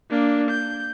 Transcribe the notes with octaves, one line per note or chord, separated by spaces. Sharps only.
A#3 D4
G6